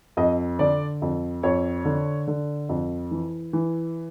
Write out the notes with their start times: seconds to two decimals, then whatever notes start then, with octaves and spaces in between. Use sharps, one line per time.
0.17 F2 D#5
0.59 D3 D5
1.02 F2
1.43 F2 C#5
1.85 D3
2.27 D3
2.69 F2
3.11 E3
3.53 E3